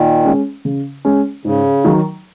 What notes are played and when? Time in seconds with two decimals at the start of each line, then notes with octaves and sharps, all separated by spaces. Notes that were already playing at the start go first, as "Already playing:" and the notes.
Already playing: A#2 D#3
0.25 G#3 C#4
0.65 C#3
1.05 G#3 C#4
1.45 G#2 C#3
1.85 D#3 F#3